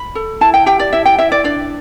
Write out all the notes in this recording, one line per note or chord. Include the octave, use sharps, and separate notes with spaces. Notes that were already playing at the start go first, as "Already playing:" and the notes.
Already playing: B5
A4
E4 A5
G5
G4 G5
D5
E4 E5
G5
E4 E5
D5
D4 D5